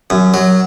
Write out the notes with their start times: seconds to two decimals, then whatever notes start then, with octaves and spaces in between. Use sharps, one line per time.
0.10 F#2
0.34 F#3